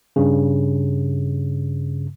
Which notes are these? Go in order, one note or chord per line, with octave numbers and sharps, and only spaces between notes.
G2 C#3